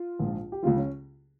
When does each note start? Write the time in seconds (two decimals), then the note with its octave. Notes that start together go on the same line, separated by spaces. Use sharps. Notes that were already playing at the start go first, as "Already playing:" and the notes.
Already playing: F4
0.19 A#1 G#2 F3
0.52 G4
0.62 C#2 C#3 F3 F4
0.77 C#4